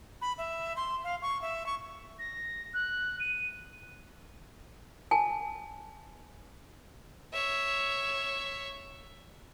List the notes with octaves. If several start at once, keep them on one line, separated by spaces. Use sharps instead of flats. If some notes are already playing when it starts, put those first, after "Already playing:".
B5
E5
C6
F5
C#6
E5
C#6
A#6
F#6
D#7
G#5 A5
C#5 E5